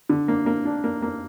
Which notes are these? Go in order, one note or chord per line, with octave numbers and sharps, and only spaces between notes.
D3
A#3
A#3
D4
A#3
A#3